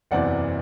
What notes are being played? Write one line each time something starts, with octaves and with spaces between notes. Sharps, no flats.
F#1 E2 C3 E3 D5 F#5